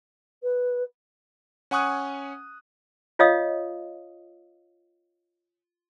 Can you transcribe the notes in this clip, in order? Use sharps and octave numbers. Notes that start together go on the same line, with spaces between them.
B4
C#4 F#5 G#5 C#6 D#6 F#6
F4 C#5 D#5 F5 D#6